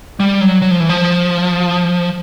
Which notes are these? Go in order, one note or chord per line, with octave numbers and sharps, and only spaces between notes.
G3
F#3
F#3
F3
E3
F3